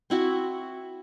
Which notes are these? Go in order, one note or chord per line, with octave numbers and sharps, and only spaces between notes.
C4 E4 F#4